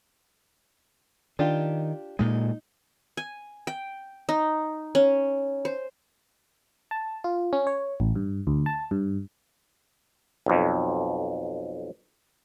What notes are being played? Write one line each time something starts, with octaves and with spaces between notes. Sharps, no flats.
D#3 D4 F4 G4
A#2 G#3 D#4
G#5
G5
D#4
C#4
C5
A5
F4
C#4
C#5
A1
G2
D2
A5
G2
B1 F2